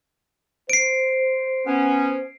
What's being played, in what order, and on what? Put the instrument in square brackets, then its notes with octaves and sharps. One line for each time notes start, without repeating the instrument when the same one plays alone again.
[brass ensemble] C5 [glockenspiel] C7 D7
[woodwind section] B3 C#4